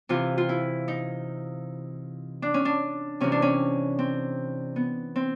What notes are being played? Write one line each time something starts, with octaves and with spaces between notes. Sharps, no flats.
C3 E3 F4
F4
E4
D#4
D4
C#4
D4
C3 E3 C#4
D4
C#4
C4
B3
C4